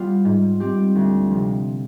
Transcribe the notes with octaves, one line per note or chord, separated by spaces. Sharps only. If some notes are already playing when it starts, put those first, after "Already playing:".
Already playing: G3 B3 F4
G#2
G3 C4 G4
D2
C3 F3